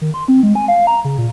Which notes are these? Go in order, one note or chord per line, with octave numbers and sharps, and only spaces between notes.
D#3
C6
C4
G#3
G#5
F5
A#5
C#3
A#2